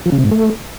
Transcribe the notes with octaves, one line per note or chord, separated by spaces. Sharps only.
F3
C#3
C3
G#2
A3